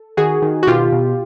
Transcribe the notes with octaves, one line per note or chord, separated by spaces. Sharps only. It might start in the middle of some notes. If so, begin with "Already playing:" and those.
Already playing: A4
D#3 F#4 G#4
D#3
F#4
B2 F4 G4
B2